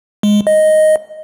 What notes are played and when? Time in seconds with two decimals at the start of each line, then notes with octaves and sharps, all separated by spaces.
0.23 G#3
0.47 D#5